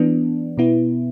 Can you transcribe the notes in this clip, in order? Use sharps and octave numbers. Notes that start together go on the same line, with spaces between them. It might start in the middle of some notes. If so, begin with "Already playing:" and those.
Already playing: E3 B3 D4
B2 B3 E4